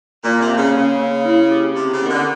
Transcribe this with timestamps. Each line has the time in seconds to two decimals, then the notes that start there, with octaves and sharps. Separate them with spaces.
0.23 A#2 A#3
0.40 C3
0.50 A#3
0.57 C#3
0.75 C#3 A#3
0.99 A#3
1.25 E4
1.51 G4
1.76 C3 G4
1.93 C#3
2.02 D#3 B3
2.10 D3